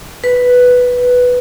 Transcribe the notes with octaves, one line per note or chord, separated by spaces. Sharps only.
B4